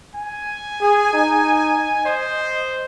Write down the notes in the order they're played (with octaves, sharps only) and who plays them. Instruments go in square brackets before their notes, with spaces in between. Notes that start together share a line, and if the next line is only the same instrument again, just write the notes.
[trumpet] G#5
[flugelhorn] G#4
D#4
[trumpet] C5 [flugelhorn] D#5